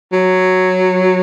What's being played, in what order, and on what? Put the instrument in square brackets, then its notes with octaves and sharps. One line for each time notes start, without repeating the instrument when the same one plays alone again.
[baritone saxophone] F#3